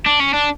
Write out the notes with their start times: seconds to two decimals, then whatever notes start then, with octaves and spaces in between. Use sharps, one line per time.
0.06 D4
0.20 C#4
0.34 D4